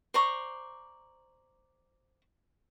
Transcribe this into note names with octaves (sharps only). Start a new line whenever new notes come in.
C5 D5 A#5 C#6